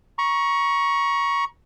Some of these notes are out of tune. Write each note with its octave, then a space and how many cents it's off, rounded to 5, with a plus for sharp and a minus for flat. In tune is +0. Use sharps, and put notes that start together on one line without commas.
A#5 +35 C#6 +0